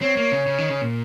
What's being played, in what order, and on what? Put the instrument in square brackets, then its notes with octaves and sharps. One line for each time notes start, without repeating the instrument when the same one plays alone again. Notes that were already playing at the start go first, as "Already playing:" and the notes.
[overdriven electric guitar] C4 [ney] C#5
[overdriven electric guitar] A#3
C#3
C#3
D#3
C#3
A#2